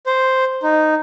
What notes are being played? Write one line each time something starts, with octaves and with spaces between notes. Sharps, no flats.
C5
D#4